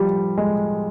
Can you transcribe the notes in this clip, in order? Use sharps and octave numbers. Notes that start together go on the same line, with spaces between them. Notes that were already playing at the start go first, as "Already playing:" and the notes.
Already playing: F3 G3
G#3